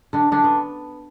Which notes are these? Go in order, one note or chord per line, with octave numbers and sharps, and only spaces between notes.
D3 D4
D3 D4
B3